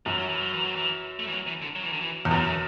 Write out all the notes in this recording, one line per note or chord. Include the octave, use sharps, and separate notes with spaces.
F#2 E3
F#3
E3
F#3
E3
F#3
E3
A3
E3
F#3
E3
D3
F#3
E3
D3
E3
E2
F#2 F#3
E3
D3